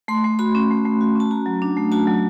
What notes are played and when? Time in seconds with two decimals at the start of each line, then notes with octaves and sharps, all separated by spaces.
0.08 A3 C6
0.24 A3
0.39 F#4 B5
0.55 C#4
0.70 A3
0.85 A3
1.01 F#4
1.15 C#4 A5
1.31 F#4 A#5
1.46 F#3
1.62 D4
1.77 A3
1.92 F#4 A5
2.07 F#3